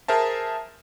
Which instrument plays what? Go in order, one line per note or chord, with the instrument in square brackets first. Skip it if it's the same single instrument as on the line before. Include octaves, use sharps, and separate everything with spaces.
[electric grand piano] G#4 A#4 C5 E5 A5